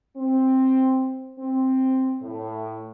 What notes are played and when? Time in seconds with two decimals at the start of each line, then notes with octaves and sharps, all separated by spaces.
0.17 C4
1.39 C4
2.22 A2